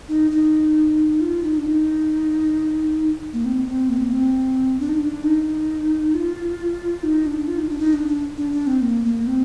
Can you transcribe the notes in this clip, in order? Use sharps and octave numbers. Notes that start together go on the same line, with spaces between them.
D#4
D#4
F4
D#4
D4
D#4
A#3
C4
C4
A#3
C4
A#3
C4
D4
D#4
D4
D#4
F4
D#4
D4
F4
D#4
D4
D#4
D4
D4
D4
D4
C4
A#3
A#3
C4